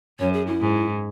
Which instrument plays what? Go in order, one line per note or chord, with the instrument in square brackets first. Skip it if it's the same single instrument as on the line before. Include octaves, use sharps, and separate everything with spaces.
[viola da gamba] F#2 [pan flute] C#5
[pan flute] G#4
E4
[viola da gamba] G#2